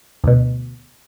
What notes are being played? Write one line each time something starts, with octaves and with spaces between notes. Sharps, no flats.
D2 B2